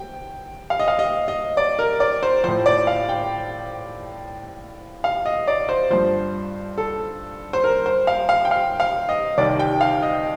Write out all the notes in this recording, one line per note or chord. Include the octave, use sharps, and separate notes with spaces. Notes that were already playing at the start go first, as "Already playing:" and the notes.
Already playing: G5
F5
D#5
F5
D#5
D#5
D5
A#4
D5
C5
A2 F3 C5
D5
F5
G5
F5
D#5
D5
C5
G2 F3 C5
A4
C5
A#4
C5
F5
F5
G5
F5
F5
D#5
C2 C3 D#3 G3 D5
G5
F5
D#5